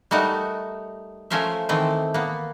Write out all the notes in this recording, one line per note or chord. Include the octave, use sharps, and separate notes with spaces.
G3 A3 D#4 F#4 A#4
F3 A3 C#4 A#4 C5 E5
D#3 E3 A3 C4
A#3 B3